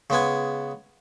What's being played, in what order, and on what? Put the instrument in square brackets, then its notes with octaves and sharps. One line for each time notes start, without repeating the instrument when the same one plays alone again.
[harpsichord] C#3 G#3 B3 G#5